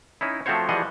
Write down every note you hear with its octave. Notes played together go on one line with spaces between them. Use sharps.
C#4 D#4 E4
F3 A3 C4 F#4 C5 C#5
E3 F3 G3 G#4 D#5 F#5